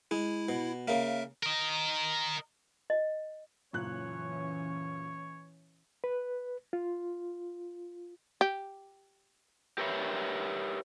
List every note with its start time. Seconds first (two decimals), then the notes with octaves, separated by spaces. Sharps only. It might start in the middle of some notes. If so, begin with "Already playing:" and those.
0.11 G#3 E4
0.49 B2
0.88 C#3 A#3 A#4 E5
1.43 A#4 D#5
2.90 D#5
3.73 F#1 A#2 E3 C#4 C#5 F#6
6.04 B4
6.73 F4
8.41 G4
9.78 G4 A#4 B4 C#5 E5